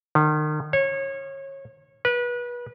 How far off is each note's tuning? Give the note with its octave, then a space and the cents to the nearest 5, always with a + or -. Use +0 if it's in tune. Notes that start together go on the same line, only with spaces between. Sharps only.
D#3 -35
C#5 -25
B4 -30